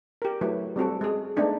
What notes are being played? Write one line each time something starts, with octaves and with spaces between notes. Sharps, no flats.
G4 A#4
F#3 A3 E4 B4
G3 C4 F#4 A4
G#3 G#4
G#3 A3 B3 D4 D#4